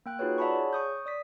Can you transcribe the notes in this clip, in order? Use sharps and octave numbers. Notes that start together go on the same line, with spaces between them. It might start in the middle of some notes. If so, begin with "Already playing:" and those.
A#3 G5 F#6
D#4 F4 F#4 G#4 B4 C#5
D5 E5 F#5 A5 B5 C#6
G#4 C#5
C#6 D#6 G6
D5 D#6 B6